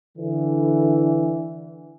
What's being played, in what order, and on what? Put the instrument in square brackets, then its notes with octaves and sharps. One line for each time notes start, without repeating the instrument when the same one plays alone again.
[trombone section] D3 E3